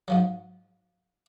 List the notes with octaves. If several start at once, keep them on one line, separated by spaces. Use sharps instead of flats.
G#2 F3 F#3